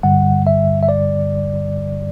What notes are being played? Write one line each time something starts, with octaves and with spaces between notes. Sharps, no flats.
G2 D3 G3 F#5
E5
E5
D5